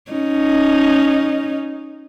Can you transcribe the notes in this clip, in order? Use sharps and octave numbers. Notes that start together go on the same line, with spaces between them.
C#4 D#4